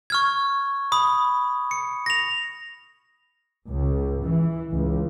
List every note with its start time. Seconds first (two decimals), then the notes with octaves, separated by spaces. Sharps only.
0.10 C#6 F6 G#6
0.92 B5 D#6
1.71 C#7
2.06 A#6 F7
3.68 C#2
4.24 E3
4.72 C#2